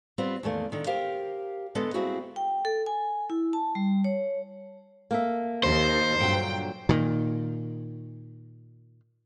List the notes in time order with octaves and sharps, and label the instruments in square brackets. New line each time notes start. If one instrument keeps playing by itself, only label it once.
[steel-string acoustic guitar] G3 B3 C4 F4
E2 D#3 A3 A#3
D3 D#3
G4 A#4 C5 F5
D3 G#3 B3 A4 D#5
G3 A#3 C4 E4 F#4 G#4
[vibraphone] G5
A4
G#5
E4
A5
G3
C#5
[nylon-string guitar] A#3 A4 E5
[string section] D#2 [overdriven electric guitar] C5
[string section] G2 G5 [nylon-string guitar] A#2 D3 F#3
[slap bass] A#2 D#3